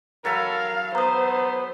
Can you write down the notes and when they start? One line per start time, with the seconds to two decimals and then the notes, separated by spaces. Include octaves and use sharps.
0.25 F#3 A4 A#4 F5 B5
0.95 B3 C5 A#5 D#6